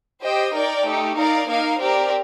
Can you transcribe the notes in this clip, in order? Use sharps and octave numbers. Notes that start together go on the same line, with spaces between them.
G4 C5 D#5 G5
D#4 A#4 D5 G5
A3 D#4 G4
D#4 A#4 D5 F5
A#3 D#4 A#4 F5
C4 G4 A#4 D5